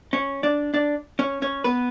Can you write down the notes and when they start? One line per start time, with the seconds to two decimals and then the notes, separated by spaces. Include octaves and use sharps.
0.13 C#4 C#5
0.43 D4 D5
0.74 D4 D5
1.19 C#4 C#5
1.42 C#4 C#5
1.64 B3 B4